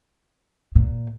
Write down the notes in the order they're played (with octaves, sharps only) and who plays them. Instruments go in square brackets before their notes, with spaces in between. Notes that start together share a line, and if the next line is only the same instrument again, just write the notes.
[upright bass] A#2